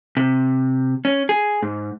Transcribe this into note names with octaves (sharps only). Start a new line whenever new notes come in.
C3
C#4
G#4
G#2